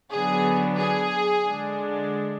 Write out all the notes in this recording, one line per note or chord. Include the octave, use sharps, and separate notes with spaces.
D3 F#3 B3 D4 G#4
G#4
D3 G#3 D4